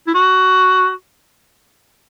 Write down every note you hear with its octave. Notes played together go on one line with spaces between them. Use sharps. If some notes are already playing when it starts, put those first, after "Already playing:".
E4
F#4